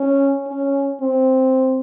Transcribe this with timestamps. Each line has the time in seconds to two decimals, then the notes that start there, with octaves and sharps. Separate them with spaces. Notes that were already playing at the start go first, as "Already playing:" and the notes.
Already playing: C#4
0.47 C#4
1.01 C4